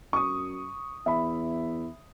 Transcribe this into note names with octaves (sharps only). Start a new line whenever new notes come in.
F#2 C#6 D#6
E2 E5 B5